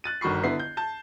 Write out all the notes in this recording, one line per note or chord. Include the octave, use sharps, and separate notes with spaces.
F#6 A6 D#7
G1 D#3 F#4 B5 C#6 C7
D3 B3 E4 C7
G6
A5 G6